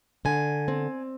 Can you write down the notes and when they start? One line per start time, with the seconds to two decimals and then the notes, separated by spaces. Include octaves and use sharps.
0.25 D3 G#5
0.68 C4